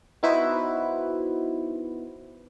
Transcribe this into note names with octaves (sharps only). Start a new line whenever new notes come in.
B3 D#4 E4 F#4 B4 C5